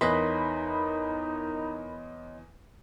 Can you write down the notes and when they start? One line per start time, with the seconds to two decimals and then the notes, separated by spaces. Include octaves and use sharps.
0.01 E2 D#4 A#4 C#5 D#5 B5 C6 F#6